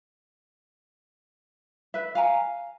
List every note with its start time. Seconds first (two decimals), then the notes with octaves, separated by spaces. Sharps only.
1.94 B4 E5
2.15 F5 G#5 A#5